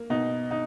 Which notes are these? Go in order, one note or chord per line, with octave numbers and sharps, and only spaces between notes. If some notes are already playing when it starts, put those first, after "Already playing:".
Already playing: A#3
B2 D#4
D#4